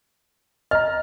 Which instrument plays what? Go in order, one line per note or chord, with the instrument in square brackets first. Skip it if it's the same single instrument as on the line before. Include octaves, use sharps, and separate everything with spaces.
[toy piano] D#5 [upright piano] A#5 F6